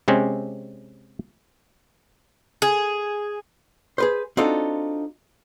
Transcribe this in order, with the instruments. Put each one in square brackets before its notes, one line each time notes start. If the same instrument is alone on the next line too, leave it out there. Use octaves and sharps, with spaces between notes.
[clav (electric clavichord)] C3 G#3 C4 C#4
[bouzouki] G#4
[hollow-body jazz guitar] G#4 B4 C5
C4 D4 D#4 F4 F#4 A4